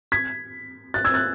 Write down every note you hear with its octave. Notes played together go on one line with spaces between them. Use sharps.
G#6 B6
F#6 A6
E6 G#6
F#6 A6